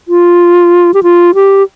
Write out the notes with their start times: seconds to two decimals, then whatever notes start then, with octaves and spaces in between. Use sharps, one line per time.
0.08 F4
0.94 G4
1.03 F4
1.35 G4